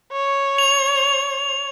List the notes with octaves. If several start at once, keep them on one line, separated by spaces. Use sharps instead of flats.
C#5
F7